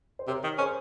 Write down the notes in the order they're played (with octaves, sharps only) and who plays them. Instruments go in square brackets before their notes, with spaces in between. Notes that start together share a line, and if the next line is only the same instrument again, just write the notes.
[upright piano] C5
[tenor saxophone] C3 [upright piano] A#4 C#5
[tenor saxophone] D#3
[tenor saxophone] C#4 [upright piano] G#4 C5